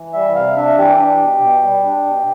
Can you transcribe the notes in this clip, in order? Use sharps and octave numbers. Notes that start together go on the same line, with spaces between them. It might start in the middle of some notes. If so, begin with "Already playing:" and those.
Already playing: E3
G3 E5
C3 F5
D4 E5
E3 G4
D4
B2
B2
G3
D4
B2